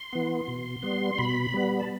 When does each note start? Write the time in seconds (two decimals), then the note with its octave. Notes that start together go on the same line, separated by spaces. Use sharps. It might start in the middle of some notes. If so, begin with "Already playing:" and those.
Already playing: C6
0.13 E3 B3
0.48 B2
0.83 G3 B3
1.18 B2 B5
1.54 G3 B3
1.80 A5